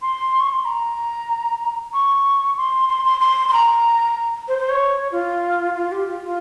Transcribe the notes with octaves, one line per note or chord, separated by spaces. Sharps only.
C6
C#6
C6
A#5
C#6
C6
C6
C6
C6
C6
A#5
C5
C5
C#5
F4
F4
G4
F4
F4